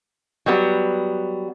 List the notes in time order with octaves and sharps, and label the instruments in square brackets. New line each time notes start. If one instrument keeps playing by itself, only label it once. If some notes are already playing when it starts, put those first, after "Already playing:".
[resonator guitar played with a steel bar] F#3 G3 B3